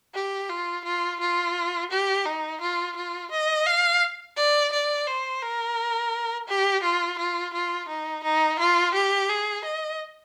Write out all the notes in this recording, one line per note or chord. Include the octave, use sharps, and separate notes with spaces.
G4
F4
F4
F4
G4
D#4
F4
F4
D#5
F5
D5
D5
C5
A#4
G4
F4
F4
F4
D#4
D#4
F4
G4
G#4
D#5